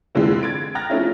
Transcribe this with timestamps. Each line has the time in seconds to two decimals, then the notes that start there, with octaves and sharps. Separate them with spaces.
0.15 F2 D3 E3 G#3 C4
0.43 G#6 A6 D7
0.75 G5 A#5 F6 F#6 A6 A#6
0.90 F3 A3 C4 C#4 D#4 E4